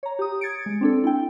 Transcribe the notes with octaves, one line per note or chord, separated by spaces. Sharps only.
C#5 A#5
G4 D#6
G#6 A6 C#7 D7
G#3
C4 D4 A4
E4 G5